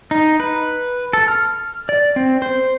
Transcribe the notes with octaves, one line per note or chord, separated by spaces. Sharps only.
D#4
B4
A4
F6
D5
C4
C5